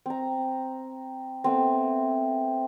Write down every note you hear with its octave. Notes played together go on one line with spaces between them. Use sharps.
C4 A#5
A3 B3 C4